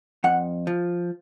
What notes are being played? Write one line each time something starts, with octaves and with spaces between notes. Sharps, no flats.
F2 F#5
F3